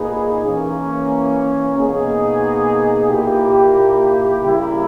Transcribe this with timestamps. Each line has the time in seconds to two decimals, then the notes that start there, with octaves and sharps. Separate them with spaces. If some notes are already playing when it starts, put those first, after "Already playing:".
Already playing: A#2 A#3 D#4 G#4 B4
0.44 E3 A#3 C#4
1.76 B2 A#3 D#4 G#4
3.09 A#2 A#3 E4 G4
4.42 C#3 G3 A#3 E4 A#4